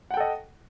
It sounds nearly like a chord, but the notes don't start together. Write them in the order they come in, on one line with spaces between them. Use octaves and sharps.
F#5 G5 A4 D#5